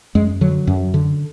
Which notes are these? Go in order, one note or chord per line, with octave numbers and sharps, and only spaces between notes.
F#2 G#3
D3 F#3
F#2
D3